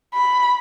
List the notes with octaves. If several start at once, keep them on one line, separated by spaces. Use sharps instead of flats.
B5